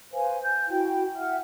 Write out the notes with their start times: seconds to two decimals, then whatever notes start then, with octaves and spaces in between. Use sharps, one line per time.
0.13 B4 C5 F5 G#5
0.42 G#5 G6
0.69 E4 F#4 G5
1.15 E5 F#5 F6